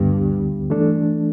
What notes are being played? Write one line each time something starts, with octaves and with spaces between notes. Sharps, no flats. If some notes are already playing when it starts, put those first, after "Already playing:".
Already playing: D2 G2 D3 B3 G4
E3 A3 D4 A4